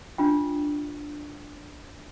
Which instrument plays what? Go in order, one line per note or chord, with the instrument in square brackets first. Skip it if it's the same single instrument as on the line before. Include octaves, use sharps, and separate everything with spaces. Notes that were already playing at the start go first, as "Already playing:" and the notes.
[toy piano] D4 F4 G5